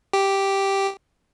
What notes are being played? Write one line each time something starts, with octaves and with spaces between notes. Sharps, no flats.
G4